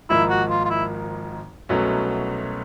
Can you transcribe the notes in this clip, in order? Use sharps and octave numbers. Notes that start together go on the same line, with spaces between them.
G#1 G#2 F3 A#3 D#4 E4
F#4
F4
F4
E4
C2 B2 F#3 A3 C#4